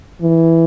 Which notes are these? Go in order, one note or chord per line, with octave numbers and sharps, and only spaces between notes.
E3